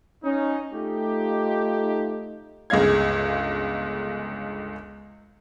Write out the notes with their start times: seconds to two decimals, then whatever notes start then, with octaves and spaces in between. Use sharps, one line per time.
0.25 C#4 D#4
0.72 A3 D#4 F4 G4
2.70 G1 C#2 G#3 D#5 F5 G#6